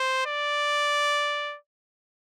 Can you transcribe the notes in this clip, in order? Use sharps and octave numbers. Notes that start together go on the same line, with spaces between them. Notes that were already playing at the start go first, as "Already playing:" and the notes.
Already playing: C5
D5